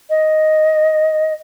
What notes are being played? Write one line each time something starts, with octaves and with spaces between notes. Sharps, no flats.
D#5